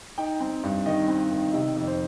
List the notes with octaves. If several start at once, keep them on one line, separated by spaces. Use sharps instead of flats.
D#4 G5
C4
G2
D#3 D#5
C4
D#3
C3 D#5
F2
C5